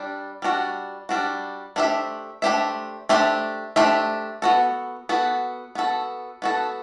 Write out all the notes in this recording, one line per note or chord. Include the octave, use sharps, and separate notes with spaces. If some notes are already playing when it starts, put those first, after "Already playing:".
Already playing: G3 D4
G3 D4 F#4
G3 D4 F#4
A3 D4 G4 C5 E5
A3 D4 G4 C5 E5
A3 D4 G4 C5 E5
A3 D4 G4 C5 E5
B3 F#4 A4
B3 F#4 A4
B3 F#4 A4
B3 F#4 A4